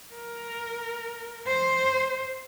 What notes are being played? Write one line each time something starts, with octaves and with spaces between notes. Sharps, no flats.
A#4
C5